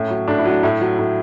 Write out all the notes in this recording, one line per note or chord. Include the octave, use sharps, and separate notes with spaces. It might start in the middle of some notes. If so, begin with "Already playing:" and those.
Already playing: A2 C#4
F#3
A2 D4
E4
F#3 D4
A2 E4
F#3
A2